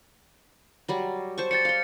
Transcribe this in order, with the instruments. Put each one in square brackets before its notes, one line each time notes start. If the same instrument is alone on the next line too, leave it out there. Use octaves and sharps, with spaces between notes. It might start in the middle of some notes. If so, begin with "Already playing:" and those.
[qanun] F#3 G3 D5
C5 A5 C#6
[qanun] D5 G5 [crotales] A6 C#7
[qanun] F5 C6